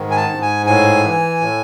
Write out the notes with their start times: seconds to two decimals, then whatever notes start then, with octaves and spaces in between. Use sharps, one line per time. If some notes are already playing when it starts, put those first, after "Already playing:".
Already playing: G#2 D#3
0.11 G#5
0.16 A5
0.29 G#2
0.42 G#5
0.66 A2 G#5
1.04 E3
1.41 A2